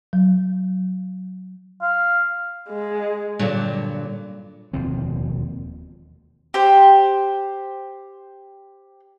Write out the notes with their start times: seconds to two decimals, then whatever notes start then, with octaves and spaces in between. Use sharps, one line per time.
0.13 F#3
1.82 F5
2.69 G#3
3.39 G2 A#2 D3 F#3
4.73 E1 D#2 F3 C4
6.54 G4 C5